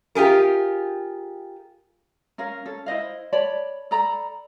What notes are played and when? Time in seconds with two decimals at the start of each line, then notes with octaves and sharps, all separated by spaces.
0.15 F4 G4 G#4 A#4
2.38 C#4 A#4 F5
2.66 C#4 A4
2.86 E4 C5 D#5 F5
3.33 C#5 D5 A5 B5
3.91 A4 D5 A#5 B5